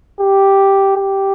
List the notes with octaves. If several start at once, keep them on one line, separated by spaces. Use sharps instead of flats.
G4
G4